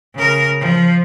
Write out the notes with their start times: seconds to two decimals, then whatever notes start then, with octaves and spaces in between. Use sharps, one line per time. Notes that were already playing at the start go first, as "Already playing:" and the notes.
0.15 C#3 A#4
0.59 F3